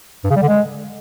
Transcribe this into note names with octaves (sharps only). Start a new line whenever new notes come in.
G2
C#3
G3
D3
G#3